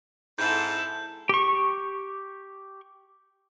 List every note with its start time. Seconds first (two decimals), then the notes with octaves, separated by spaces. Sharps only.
0.39 F2 G#2 E4 A4 G6
1.29 G4 C#6